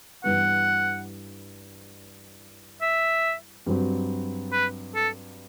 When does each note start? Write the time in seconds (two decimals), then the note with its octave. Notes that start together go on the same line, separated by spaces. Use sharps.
0.24 G2 E3 G3 B3 F#5
2.81 E5
3.66 G2 F#3 C4
4.52 B4
4.95 A4